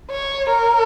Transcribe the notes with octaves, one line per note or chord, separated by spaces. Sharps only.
C#5
A#4